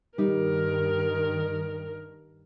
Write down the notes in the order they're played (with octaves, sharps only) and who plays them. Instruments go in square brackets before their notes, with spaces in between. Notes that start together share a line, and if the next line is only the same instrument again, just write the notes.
[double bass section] G2 D#3 [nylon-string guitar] G3 D#4 [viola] A#4